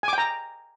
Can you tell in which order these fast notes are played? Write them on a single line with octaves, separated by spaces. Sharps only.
G#5 D6 G5 A#5